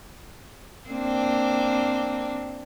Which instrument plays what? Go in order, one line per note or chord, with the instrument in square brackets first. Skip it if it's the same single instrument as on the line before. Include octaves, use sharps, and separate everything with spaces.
[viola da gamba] A#3 C4 D4